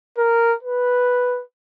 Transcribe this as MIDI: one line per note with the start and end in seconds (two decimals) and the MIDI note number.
0.18 0.54 70
0.63 1.42 71